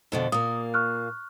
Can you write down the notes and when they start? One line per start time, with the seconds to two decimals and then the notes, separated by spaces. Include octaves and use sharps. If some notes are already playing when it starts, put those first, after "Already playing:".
0.12 F2 B2 D3
0.32 A#2 A#3 D#6
0.74 C#6 F6 F#6